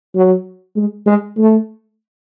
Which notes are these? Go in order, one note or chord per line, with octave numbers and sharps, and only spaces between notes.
F#3
G#3
G#3
A3